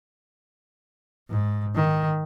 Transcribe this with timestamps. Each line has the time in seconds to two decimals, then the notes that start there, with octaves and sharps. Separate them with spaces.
1.29 G#2
1.75 D#3